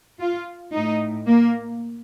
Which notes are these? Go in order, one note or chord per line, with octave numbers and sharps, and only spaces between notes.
F4
A2 D#4
A#3